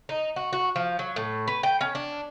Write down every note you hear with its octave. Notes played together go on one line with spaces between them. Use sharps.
D#4
F#4
F#4
F3
F#3
A2
B4
G5
C#4
D4